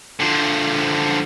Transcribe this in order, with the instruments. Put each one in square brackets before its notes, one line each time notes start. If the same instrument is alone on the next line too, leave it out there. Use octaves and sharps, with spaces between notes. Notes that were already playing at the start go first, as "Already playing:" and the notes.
[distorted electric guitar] D3 F3